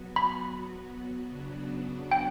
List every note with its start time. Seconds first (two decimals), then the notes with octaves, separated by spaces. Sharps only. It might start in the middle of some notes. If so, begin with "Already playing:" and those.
Already playing: F#3 B3 F#4
0.16 B5
1.28 C#3 F#3 B3 D4 F#4
2.11 G5